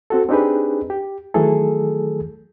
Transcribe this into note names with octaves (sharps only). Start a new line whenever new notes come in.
C4 F#4 A4
C4 D4 D#4 G4 G#4 B4
G4
D#3 E3 F#3 A3 G#4 A4